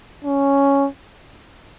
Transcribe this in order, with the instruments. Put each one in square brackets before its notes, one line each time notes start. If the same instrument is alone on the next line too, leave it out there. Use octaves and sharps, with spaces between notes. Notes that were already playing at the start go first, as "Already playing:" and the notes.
[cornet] C#4